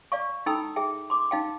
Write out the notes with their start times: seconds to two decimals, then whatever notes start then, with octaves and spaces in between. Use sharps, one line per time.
0.12 D5 F5 C#6
0.46 D#4 E4 A4 G5 B5 E6
0.76 G#4 E5 G5
1.10 C6 D6
1.31 D#4 F5 G5